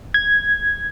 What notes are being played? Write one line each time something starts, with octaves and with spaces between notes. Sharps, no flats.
G#6